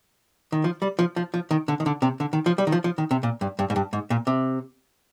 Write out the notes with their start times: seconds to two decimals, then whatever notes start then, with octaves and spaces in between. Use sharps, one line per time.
0.52 D#3
0.64 F3
0.82 G3
0.99 F3
1.16 F3
1.34 F3
1.51 D#3
1.68 D3
1.80 D#3
1.86 D3
2.02 C3
2.20 D3
2.33 D#3
2.46 F3
2.58 G3
2.67 D#3
2.72 F3
2.84 F3
2.98 D#3
3.11 C3
3.23 A#2
3.41 G2
3.59 G2
3.70 G#2
3.76 G2
3.93 G#2
4.10 A#2
4.27 C3